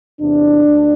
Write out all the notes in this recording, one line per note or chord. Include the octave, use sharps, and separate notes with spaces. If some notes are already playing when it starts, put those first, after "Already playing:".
E2 C3 E3 D4
D2